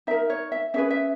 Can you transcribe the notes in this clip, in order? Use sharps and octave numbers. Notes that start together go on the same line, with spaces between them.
D#4 A#4 E5
C#5
E5
C#4 G#4 B4 E5
E5